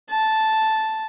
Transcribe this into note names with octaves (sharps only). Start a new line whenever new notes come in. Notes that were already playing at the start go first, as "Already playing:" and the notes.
A5